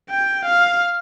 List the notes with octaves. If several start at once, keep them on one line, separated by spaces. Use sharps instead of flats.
G5
F5